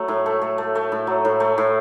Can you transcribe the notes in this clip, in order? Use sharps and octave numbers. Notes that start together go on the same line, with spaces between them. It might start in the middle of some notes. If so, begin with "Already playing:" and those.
Already playing: F#3 A3
A2
A3
A3
A3
A3
A2
F#3
A2
A3
A2